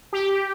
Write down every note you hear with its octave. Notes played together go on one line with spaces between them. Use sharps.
G4